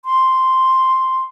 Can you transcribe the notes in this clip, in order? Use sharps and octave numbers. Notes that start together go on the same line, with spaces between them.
C6